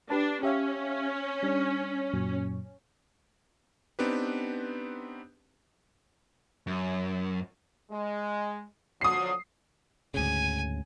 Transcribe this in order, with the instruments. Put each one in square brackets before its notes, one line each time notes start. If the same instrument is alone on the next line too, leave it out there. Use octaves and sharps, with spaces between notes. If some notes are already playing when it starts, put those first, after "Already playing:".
[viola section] D4 [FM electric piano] G4 B4 A5
[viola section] C#4 [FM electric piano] G4 E5 F5
[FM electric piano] G3 D4
F#2 A#2 F#3
[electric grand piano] B3 C4 D4 D#4 G4 B4
[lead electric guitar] F#2
[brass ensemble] G#3
[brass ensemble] D3 F3 F#3 [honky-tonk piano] D#6 C7
[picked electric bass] D2 G#2 C#3 [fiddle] G#5